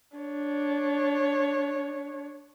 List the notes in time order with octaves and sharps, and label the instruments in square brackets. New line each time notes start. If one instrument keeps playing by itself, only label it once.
[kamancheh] D4 C#5